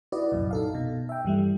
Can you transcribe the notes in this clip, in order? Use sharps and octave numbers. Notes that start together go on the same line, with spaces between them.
E4 F#4 B4 D5 D#5
C2 F#2 A#2
D#4 A4 F5
B2
E5 G5
G2 E3 G3 A3